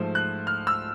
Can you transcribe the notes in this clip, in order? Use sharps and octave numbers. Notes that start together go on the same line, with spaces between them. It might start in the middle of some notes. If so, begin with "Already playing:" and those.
Already playing: G#2 F3 A3
F#6
F6
E6